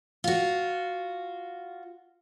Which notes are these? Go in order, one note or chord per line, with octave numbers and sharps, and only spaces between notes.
F4 F#4